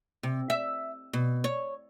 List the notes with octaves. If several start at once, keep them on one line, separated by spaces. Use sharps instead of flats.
C3
E5
B2
C#5